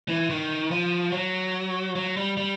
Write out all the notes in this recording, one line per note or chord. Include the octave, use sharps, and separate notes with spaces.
E3
D#3
F3
F#3
F#3
G3
G3